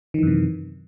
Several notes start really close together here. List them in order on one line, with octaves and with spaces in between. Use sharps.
D#3 E3 F#2 C3